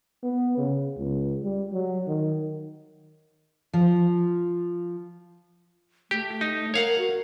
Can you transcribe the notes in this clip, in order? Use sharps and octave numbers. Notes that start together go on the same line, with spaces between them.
B3
C#3
C#2
G3
F#3
D#3
F3
A3 G4
D#4
A#4 C#5 F5 F#5
F#4